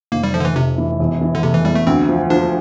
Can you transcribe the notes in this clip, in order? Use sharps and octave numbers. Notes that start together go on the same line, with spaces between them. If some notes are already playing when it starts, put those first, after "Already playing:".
F1 A#3
G3
F3 A3
D3
E3
F1 C3
E3
E1
E3
D3
C3 A3
E3
E2 G3
A3
D2 C4
F3
F3 D4